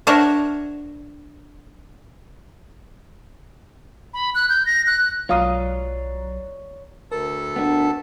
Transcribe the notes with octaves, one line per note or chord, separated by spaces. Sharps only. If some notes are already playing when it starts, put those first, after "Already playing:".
D4 A#4 C5 C#5 E5 F#5
B5
F#6
G6
A#6
F#6
B1 F#3 F4 C#5 D5 F5 A#5 D#6
D2 A4 A#4 A5
B3 D4